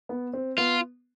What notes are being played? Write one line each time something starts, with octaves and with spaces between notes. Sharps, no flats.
B3
C4
B3 F4